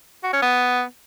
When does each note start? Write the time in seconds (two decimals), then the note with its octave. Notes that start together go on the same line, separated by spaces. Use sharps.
0.24 F#4
0.33 C#4
0.42 B3